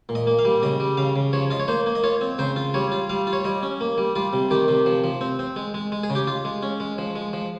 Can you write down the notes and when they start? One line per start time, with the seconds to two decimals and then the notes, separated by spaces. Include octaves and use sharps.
0.09 A#2
0.15 D#5
0.27 A#3
0.39 F5
0.45 G3
0.63 C#3 D#5
0.80 G3
0.97 C#3 F5
1.16 C#3
1.33 F3 C#5
1.50 F4 D#5
1.60 C#5
1.68 A#3 C5
1.86 A#3
1.95 D#5
2.03 F4 C#5
2.21 C4
2.39 C#3 C5
2.56 F4
2.74 G3 C#5
2.92 F4
3.10 G3 F5
3.27 F4
3.33 C#5
3.44 G3 D#5
3.63 C#4
3.81 A#3
3.98 G3
4.15 G3 F4
4.33 C3
4.51 D#3 G4
4.68 C3
4.86 F3
5.04 F3
5.21 C4
5.39 C4
5.56 G#3
5.74 G#3
5.92 G#3
6.03 G#4
6.10 C#3
6.15 G4
6.27 F4
6.45 G#3
6.63 C#4
6.80 G#3
6.98 F3
7.16 G#3
7.33 F3